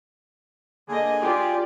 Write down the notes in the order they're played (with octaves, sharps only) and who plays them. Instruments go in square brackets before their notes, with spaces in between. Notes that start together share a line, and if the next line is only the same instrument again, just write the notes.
[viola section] D3 A#3 D#5 [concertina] G#4
[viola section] F4 G4 D5